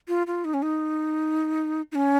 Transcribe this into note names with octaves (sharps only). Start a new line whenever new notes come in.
F4
F4
D#4
C#4
D#4
D#4
C#4